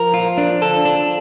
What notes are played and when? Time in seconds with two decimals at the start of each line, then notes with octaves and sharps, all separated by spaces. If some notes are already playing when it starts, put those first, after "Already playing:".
Already playing: F3 A#4
0.14 F4
0.38 D4
0.62 A4
0.85 D4